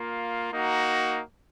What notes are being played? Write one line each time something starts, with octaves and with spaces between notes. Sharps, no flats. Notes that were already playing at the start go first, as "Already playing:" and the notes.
Already playing: A#3 F4
A#3 D#4 F#4